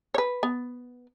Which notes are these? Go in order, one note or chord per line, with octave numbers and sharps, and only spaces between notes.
B4 C#5
B3